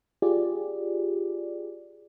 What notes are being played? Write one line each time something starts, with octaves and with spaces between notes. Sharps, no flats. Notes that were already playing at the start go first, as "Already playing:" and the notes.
F4 G4 G#4 D5